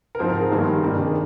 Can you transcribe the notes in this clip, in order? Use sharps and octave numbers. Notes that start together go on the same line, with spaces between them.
A#4
G#2 F3 C4 C5
A#4
G#4
G1 G2 D#3 A#3
F1 F2 D#3 A#3 D4
G#4